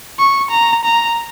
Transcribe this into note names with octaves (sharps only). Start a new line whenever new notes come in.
C#6
A#5
A#5